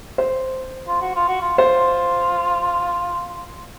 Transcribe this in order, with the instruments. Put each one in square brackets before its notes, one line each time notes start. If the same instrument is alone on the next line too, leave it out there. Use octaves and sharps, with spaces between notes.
[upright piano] C5
[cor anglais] F4
F#4
F4
F#4
F4
[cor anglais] F4 [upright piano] C5